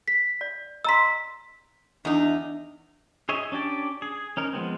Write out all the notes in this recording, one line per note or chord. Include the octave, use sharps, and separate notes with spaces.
B6
D5
D#5 A#5 C6 E6 B6
E2 D4 D#4
G#4 C#5 D#5 E5
C#4 D4 G4 D5
G#4
C#4 D#4 A#4
F3 G#3 B3 C4